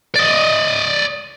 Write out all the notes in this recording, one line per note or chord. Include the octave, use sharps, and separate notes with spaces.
D5 D#5